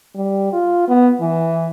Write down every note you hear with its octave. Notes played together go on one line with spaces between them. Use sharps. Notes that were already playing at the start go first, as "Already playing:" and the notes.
G3
F4
B3
E3